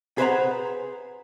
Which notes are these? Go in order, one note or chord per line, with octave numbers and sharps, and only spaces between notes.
G#4 B4 C5 D5 F#5 A#5